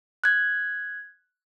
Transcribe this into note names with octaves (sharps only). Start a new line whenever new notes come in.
F#6 G#6